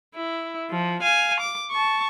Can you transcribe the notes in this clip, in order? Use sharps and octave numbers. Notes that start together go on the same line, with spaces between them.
E4
F3
F5 G#5
D6
A5 C#6